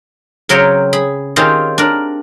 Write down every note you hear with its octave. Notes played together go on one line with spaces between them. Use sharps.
C#3 F#3 C4 A#4 C#5 G5
G#4 B5
D#3 C4 C#4 F4 G4 G#4
D4 A#4